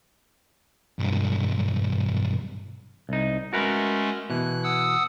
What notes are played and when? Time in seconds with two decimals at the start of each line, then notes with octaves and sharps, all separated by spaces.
0.99 B1 G2
3.09 C2 D#4
3.53 G#3 A3 C#4 F#4 A#4 B4
4.30 B2 E3 F#6
4.64 F#5 D#6 E6